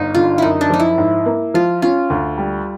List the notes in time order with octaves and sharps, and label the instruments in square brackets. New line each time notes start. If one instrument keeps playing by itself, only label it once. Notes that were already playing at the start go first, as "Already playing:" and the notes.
Already playing: [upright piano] G1 [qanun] D#4
[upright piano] D3 [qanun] F4
[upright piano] F#2 [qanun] D#4 E4
[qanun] D4
[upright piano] F3 [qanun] D#4
[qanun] E4
[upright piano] G#2
A#3
[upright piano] F3 [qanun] F4
[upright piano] C#4 [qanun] F4
[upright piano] D2
G3